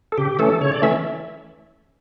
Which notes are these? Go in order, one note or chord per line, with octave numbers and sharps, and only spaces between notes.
A4
C#3 G4
E3 A3 C#4 A4
C#3 C#5
D5
E3 A3 C#4 E5